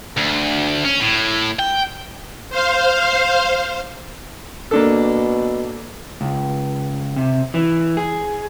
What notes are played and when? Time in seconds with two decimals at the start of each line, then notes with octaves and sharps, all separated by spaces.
0.17 D2
0.85 C#4
1.01 A2
1.59 G5
2.50 C5 F5
4.71 B2 A#3 D4 A4
6.21 C#2
7.16 C3
7.54 E3
7.97 G#4